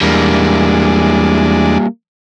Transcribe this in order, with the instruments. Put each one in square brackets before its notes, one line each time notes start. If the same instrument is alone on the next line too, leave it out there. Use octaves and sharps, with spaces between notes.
[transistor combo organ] E2 G#3 D4 [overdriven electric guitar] G3 A#3